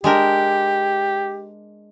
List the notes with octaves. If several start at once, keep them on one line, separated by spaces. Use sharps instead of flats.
G#3 D4 G4 A#4